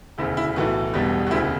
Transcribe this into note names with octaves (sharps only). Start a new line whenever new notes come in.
E1 D2 C#3 E4
E4
B1 A2 E3 F#4
E1 E2 B2 G3
F#4
E1 D2 C#3 E4